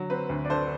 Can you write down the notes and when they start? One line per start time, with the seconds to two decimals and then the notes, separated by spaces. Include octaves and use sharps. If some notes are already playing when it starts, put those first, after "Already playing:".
Already playing: D3 F#3
0.10 C4 B4
0.29 D2
0.45 D5
0.50 D3 A4 C5